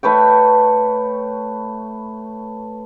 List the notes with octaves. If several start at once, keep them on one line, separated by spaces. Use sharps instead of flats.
A3 B4 C#5 G5